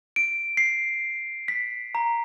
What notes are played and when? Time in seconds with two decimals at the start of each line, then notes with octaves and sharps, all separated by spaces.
0.16 D7
0.57 C7
1.48 B6
1.95 A#5